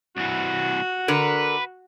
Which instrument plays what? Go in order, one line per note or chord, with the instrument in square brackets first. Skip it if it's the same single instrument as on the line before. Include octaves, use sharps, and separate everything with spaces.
[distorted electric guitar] C2 E3 [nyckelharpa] F#4
[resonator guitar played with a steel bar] D3 A#4 [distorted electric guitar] B4